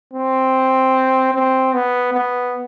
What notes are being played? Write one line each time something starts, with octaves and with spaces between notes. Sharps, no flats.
C4
C4
B3
B3